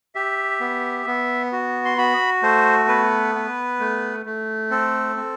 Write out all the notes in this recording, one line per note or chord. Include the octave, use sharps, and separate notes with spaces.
G4 E5
B3
B3
F#4
C6
F#4 B5
A3 C5
B3 B4
B3
A3
A3
C4 A4
C4